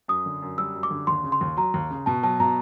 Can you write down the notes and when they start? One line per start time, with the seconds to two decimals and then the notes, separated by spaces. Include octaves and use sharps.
0.08 F#2 D#6
0.26 D3
0.42 F#2
0.58 G3 E6
0.75 F#2
0.83 D6
0.91 D3
1.07 D#2 C6
1.24 C#3
1.32 C6
1.41 D#2
1.57 F#3 A#5
1.74 D#2
1.90 C#3
2.06 B2 A5
2.23 F#3 A5
2.40 B2 A#5